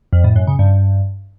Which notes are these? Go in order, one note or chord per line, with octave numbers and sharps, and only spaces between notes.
F2
A2
F#2
C#3
G2